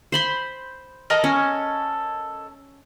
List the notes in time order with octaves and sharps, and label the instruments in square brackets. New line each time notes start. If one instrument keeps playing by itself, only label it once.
[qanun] C5 B5 C6
[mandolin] A4 A#4 D#5
[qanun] C#4